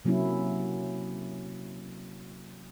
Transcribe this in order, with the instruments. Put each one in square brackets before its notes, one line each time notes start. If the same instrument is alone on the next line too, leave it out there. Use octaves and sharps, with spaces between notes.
[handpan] C3 F#3 A#3 C#4 E4